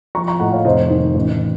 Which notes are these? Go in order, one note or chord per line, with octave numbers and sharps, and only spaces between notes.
F3 A#5 C#6
A#5 C#6
A2 F#5 A#5
C#5 F5
F1 C5 D#5
D#3
A1